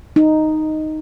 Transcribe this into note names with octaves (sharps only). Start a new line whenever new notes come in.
D#4